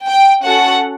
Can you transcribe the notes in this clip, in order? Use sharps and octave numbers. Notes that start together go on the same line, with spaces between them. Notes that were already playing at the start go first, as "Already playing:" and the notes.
G5
C#4 F#4 A4 F#5